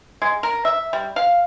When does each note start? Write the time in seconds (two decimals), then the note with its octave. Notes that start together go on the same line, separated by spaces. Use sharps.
0.22 G#3
0.43 A#4
0.65 E5
0.93 G3
1.16 F5